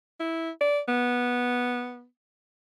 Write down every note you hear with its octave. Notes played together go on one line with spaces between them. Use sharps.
E4
D5
B3